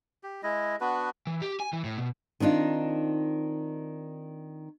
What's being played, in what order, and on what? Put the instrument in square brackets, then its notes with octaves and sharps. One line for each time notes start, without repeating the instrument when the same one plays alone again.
[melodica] G4
G#3 E4 D#5
B3 D4 F#4 B4
[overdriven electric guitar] E3
G4
G#5
E3
A2
B2
[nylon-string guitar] D#3 C4 D4 D#4 F4